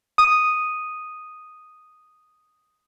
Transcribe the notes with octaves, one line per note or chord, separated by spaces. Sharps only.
D#6 D#7